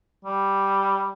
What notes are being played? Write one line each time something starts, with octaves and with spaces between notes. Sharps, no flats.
G3